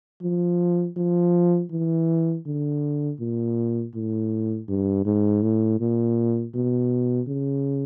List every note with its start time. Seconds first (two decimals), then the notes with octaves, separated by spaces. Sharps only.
0.22 F3
0.97 F3
1.71 E3
2.46 D3
3.20 A#2
3.95 A2
4.69 G2
5.06 G#2
5.42 A2
5.80 A#2
6.55 B2
7.28 C#3